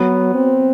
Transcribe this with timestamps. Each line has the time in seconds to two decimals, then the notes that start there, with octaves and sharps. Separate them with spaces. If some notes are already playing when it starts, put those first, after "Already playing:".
Already playing: F#3 B3
0.35 C4